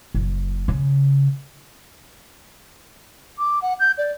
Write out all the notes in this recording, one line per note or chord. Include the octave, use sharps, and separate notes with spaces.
F#1
C#3
D6
F#5
G6
D5